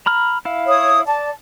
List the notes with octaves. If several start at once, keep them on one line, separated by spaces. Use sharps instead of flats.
A#5 B5 F6
E4 F5
C#5 D#6
D5 A5